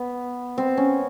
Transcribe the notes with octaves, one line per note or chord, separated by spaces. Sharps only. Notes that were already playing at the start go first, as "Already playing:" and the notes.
Already playing: B3
C4
C#4